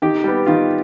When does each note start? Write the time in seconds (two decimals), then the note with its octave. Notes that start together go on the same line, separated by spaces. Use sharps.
0.02 D#3 G4
0.24 G3 B3
0.46 D#3 F4